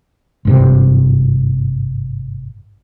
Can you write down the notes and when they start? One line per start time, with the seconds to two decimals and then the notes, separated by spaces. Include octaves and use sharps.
0.45 G#1 G2 C3